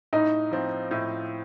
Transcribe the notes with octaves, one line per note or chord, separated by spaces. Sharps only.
A2 D#4
F3 C4 F4
A2